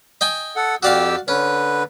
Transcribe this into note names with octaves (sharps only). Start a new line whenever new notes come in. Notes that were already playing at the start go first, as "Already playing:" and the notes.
D#5 G5 G#5
A4 F#5
F2 F#4 G4 D5 F5 E6
D3 C#4 B4